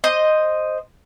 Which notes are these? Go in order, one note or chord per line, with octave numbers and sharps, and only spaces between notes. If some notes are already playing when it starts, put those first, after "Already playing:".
C5 D#5